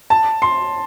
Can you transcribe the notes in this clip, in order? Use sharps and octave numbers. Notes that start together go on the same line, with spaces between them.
A5
C6